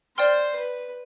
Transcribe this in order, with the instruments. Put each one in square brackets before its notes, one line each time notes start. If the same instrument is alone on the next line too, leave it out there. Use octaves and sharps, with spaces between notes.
[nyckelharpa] C5 [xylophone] D5 G5 C6 F6
[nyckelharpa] B4